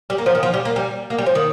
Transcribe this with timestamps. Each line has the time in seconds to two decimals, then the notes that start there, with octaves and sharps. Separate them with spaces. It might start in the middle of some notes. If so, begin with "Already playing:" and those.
0.10 G3
0.18 A#3
0.26 F3
0.35 D#3
0.43 F3
0.54 G3
0.65 A#3
0.76 G3
1.10 A#3
1.18 G3
1.26 F3
1.35 D#3